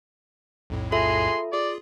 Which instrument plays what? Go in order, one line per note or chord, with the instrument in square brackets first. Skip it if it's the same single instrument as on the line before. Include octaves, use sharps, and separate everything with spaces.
[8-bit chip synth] B1 F2 A2
[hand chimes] F4 A4 E5 [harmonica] G#4 C6
[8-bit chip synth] F4 G#4 [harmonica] D5